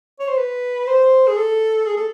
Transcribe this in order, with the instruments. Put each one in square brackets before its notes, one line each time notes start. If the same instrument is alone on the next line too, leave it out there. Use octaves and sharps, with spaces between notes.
[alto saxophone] C#5
C5
B4
C5
G#4
A4
G#4
A4